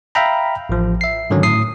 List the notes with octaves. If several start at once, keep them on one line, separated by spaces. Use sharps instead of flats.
E5 F5 G5 A#5 B5
A1 F3
E5 C7
G#2 D3 D#3 F#3 C#4
A2 D#6 C7